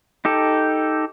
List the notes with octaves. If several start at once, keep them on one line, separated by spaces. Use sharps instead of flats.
D#4 G4 A4